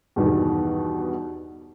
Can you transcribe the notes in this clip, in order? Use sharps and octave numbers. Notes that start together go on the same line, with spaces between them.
E2 G2 B2 D#3